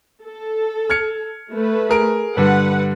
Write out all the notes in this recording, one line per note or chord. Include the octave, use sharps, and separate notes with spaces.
A4
F6 G#6 C#7
A3 B4
G#4 A#4 D7
G2 D3 G3 B4 F#5